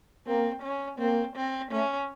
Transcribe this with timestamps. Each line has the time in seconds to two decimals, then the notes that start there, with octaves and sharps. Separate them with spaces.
0.27 A#3 C4
0.63 C#4
0.99 A#3 C4
1.36 C4
1.72 A3 C#4